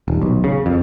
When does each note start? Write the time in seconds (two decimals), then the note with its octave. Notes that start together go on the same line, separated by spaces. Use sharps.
0.08 D#1
0.22 B1
0.44 C#3
0.66 F2